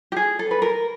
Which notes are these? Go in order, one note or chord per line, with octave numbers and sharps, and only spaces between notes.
G4
G#4
A4
B4
A#4